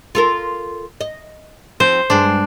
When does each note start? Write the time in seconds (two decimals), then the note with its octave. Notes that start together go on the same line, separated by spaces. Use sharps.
0.15 F4 A4 A#4
1.01 D#5
1.80 F3 C4 C5
2.10 G2 G#3 D4 C5